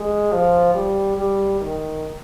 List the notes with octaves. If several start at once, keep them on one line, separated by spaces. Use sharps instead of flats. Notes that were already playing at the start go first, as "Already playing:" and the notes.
Already playing: G#3
F3
G3
G3
D#3